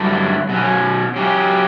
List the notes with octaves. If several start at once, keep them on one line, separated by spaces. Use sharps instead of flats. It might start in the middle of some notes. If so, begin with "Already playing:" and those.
Already playing: G2 D3 F#3 A3 E4
B2 F#3 C#4
F#3 C#4 G4